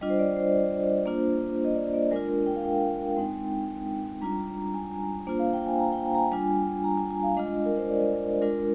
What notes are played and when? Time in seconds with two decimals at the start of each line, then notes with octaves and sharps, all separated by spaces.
0.01 G3 D4 F4 D#5
0.10 C5
0.19 D5
0.36 C5
1.06 A#3 D4 F4
1.65 D#5
1.76 D5
1.94 D5
2.11 G#3 D4 F4 A#4
2.29 A#4
2.46 G5
2.56 F5
2.64 G5
3.16 G#3 C4 D#4
4.21 G3 D4 F4 A#5
4.74 G#5
5.27 A#3 D4 F4 C5
5.39 F5
5.53 G5
5.66 G#5
5.79 A#5
5.93 G5
6.06 G5
6.15 A#5
6.18 G#5
6.32 G3 D4 F4 G#5
6.84 A#5
6.97 G#5
7.11 G#5
7.23 F5
7.37 G#3 D4 F4 D#5
7.66 A#4
7.78 C5
7.89 D5
8.41 G#3 D4 F4 A#4